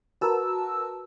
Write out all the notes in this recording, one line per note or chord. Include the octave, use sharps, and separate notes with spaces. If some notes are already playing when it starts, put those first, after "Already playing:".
F#4 A#4 B4 A5 E6